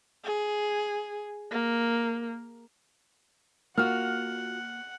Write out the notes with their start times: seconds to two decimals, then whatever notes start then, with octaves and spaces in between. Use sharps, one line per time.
0.24 G#4
1.52 A#3
3.78 A#3 F4 F#4 F#5 F6